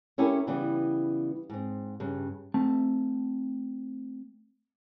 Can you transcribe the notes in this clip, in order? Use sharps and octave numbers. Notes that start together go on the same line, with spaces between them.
A3 C#4 E4 G4 A4 A#4
C#3 E3 G3 B3
G#2 C4
G2 C#3
A3 C4 A5